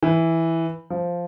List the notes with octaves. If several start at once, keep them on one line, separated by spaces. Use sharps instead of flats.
E3
F3